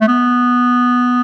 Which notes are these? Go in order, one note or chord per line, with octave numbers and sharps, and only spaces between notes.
A3
B3